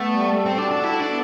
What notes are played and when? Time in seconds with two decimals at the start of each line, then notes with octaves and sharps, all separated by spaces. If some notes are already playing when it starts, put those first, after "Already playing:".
Already playing: A3 B3
0.09 G3
0.33 A4
0.46 C4
0.58 D4 F#4
0.71 D4
0.83 E4 A4
1.00 D4
1.08 B3